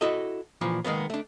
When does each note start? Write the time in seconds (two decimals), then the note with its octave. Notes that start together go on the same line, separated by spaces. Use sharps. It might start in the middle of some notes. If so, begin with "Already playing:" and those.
0.01 E4 F#4 A4 D#5
0.61 A#2 E3 F3
0.85 D#3 G#3 A#3 B3
1.10 A3 D4